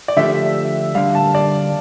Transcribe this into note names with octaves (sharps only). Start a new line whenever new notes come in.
D5
D3 F3 A3 D4 G4 E5
D2 D3 G3 F5
A5
D5